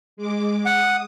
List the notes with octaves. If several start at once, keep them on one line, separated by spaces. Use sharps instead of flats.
G#3 D6
F#5 D#6